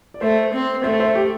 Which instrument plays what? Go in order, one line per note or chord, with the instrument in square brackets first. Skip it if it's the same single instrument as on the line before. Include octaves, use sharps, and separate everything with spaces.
[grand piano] D5
[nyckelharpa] A3 [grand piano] C5 E5
[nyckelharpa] C4
[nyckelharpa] A3 [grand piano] C5 E5
[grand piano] C5 E5
G4